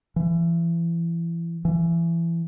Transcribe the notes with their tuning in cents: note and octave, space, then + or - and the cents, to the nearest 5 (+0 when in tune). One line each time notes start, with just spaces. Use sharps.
E3 +30
E3 +25